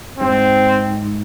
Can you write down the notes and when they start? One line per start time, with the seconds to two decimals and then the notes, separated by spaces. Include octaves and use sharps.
0.19 G2 C4
0.29 G#2